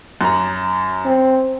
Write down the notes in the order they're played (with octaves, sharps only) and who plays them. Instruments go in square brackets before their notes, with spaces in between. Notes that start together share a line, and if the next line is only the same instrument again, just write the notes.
[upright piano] F#2 A#5
[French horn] C4